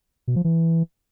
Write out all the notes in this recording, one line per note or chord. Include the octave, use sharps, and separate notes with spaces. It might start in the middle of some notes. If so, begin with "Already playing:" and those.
B2
F3
E3